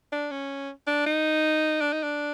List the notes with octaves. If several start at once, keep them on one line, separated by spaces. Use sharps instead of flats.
D4
C#4
D4
D#4
D4
D#4
D4